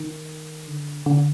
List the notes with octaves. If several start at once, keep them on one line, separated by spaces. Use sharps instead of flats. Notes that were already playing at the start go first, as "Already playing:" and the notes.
Already playing: D#3
D3
D3